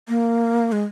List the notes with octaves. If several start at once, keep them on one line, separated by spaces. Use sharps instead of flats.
A#3
G#3